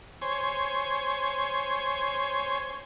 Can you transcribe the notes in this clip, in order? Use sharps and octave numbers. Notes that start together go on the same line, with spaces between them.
C5 C#5 G#5